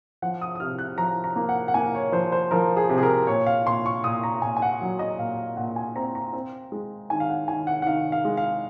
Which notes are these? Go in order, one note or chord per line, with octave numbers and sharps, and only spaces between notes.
F3 F#5
D#6
D#6
C3 F6
F#6
F3 A#5
A#5
A#3
F#5
F#5
A#3 G#5
C#5
F3 C5
C5
F3 A#4
G#4
C3
G#4
A#4
A#2 C#5
F5
A#2 C6
C#6
A#2 D#6
A#5
A#2 G#5
G#5
F#5
F#3
D#5
A#2 F5
F5
A#2 F#5
G#5
C4 A#5
A#5
C4
G#3
D#3 G#5
F5
F#5
D#3 G#5
F#5
F#5
D#3 F5
F5
G#3
F5